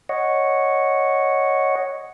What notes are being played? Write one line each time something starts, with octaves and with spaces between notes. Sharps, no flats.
C#5 D#5 F#5